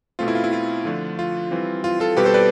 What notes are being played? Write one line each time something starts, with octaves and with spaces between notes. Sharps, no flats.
B2 A3 C4 F4
E4
F4
E4
F4
D3 F3 A3 D4
F4
E3 G3 C4
F4
F4 A4
B2 G3 C4 G4 B4
A4 C5
B4 D5